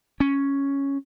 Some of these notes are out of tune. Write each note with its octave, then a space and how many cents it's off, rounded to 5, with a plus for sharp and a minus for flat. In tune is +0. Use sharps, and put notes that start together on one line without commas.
C#4 +0